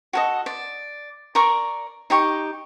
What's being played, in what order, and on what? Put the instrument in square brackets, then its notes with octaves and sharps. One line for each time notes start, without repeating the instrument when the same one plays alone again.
[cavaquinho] F#4 A4 D#5
D5
A#4 D5 A#5 C#6
D#4 G4 C#6